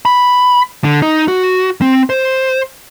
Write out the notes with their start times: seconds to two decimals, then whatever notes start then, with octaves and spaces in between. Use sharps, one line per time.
0.05 B5
0.84 D3
1.02 D#4
1.28 F#4
1.82 C4
2.10 C5